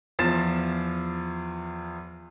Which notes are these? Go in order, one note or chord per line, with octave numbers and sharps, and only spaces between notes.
E2 F3 F4 A6 E7